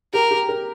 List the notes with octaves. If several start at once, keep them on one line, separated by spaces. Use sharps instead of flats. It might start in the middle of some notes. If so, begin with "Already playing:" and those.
G4 A#4
G4
A#4